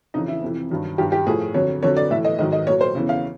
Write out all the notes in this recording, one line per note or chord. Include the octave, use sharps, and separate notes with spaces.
F2 C#3 E3 D#4
E4
F2 C3 E3
G2 D#3 F#3
G2 D#3 F#3 G4
G4
A2 F3 G#4
F2 D3 F#3 C#5
F2 D3 F#3 C#5
D5
A2 E3 E5
D#5
G#2 D#3 F#3 D#5
D#5
A#2 F#3 C#5
C5
E2 C#3 E3
F5